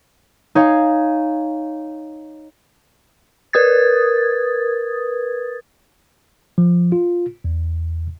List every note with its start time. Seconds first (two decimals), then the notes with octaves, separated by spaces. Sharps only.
0.55 D#4 C#5 F5 G#5
3.53 A#4 B4 D#6 G#6 A6
6.58 F3
6.92 F4
7.44 E2